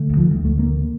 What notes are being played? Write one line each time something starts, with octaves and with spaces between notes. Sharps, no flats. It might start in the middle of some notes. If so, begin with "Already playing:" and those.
Already playing: D3 A3
D2
F3
G3
D2
A3
D3 A#3